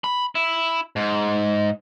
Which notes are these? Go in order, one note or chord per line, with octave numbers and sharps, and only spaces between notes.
B5
E4
G#2